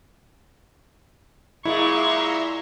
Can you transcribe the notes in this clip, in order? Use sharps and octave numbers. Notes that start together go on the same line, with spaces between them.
A#2 G#3 A#3 E4 E5 A#5 C6 C#6